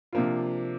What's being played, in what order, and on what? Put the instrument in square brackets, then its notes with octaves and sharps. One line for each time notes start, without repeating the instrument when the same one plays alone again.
[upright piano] C3 F3 A#3 D4 F4